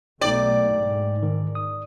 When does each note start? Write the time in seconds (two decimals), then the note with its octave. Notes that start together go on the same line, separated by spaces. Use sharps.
0.21 B1 B2 A3 D#4 D5 G5
0.74 G#2
1.23 D#3
1.55 D#6